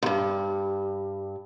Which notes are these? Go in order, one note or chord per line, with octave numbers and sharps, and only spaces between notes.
D2 G2